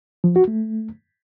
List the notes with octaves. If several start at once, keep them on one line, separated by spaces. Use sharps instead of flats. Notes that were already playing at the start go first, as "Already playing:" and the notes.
F3
F#4
A3